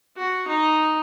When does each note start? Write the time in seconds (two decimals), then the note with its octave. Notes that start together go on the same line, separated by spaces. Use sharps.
0.17 F#4
0.48 D#4